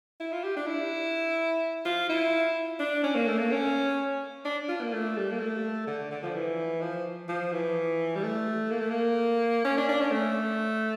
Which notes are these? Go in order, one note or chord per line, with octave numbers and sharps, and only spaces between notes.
E4
F4
G4
D4
E4
F4
E4
D4
C#4
A#3
A3
A#3
C#4
D4
F4
A#3
A3
G3
A#3
A3
D3
D3
F3
E3
F3
F3
E3
G3
A3
A#3
A3
A#3
C#4
D4
D4
C#4
A3